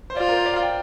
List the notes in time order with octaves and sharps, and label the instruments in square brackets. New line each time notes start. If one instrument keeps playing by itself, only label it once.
[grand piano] C5
[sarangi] F4 [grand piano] D5
[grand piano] A#4
C5
D5
F5
G5